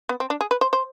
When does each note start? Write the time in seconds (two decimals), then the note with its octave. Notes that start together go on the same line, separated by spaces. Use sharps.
0.09 B3
0.20 C4
0.30 D4
0.41 G#4
0.51 B4
0.61 C5
0.73 C5